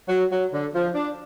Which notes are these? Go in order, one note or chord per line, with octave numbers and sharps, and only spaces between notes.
F#3
F#3
D3
F3
D4